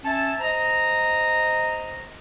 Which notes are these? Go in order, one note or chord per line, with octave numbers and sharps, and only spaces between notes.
C#4 E5 A5
C5 D#5 A#5